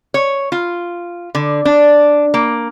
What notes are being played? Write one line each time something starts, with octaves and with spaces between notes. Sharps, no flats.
C#5
F4
D3
D4
A#3